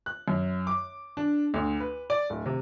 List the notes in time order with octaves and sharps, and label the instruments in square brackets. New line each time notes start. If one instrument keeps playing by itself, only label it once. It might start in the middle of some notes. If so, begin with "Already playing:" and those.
[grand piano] F#6
F#2
D6
D4
D2
B4
D5
D1
C3